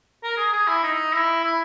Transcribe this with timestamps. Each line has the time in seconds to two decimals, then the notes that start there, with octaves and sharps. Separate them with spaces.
0.23 A#4
0.37 G#4
0.53 G#4
0.67 E4
0.83 D#4
1.14 E4
1.44 E4